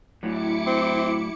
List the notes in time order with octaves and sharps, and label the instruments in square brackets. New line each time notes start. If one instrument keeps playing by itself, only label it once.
[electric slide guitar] A2 F#3 [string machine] E4 D6 C#7
[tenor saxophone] C4